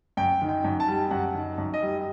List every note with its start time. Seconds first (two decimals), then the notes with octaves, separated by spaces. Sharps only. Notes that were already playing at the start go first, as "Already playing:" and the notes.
0.17 F#2 G5
0.42 D#3
0.49 G5
0.64 F#2
0.80 A5
0.88 G3
1.11 F#2 F#5
1.34 D#3
1.58 F#2
1.74 D#5
1.82 G3